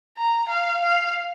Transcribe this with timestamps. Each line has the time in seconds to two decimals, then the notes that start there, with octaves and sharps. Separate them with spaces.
0.17 A#5
0.49 F5
0.81 F5